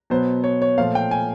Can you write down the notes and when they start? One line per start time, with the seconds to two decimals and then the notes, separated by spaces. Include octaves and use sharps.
0.10 B2 F#3 B3 C5
0.44 C#5
0.62 C#5
0.78 A#2 F3 A3 F5
0.95 G5
1.11 G#5